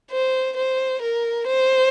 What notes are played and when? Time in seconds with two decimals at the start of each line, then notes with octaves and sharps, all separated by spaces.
0.12 C5
0.57 C5
1.01 A#4
1.47 C5